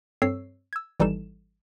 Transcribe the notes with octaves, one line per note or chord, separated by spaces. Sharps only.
G2 C4 A4 C#5 E6 C7
E6 G#6
G#1 E3 G3 D#4 A4 E7